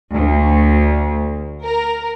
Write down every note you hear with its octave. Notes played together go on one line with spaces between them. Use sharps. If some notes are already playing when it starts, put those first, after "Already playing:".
D2
A#4